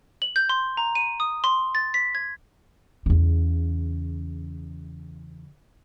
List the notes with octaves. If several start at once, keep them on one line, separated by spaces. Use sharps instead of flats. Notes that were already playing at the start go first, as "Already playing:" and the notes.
F#7
G6
C6
A#5
D#7
D#6
C6
A6
B6
G#6
E2 C#3